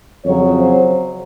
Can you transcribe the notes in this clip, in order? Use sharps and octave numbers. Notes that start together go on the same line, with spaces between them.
F2 C#3 F#3 C#5
C5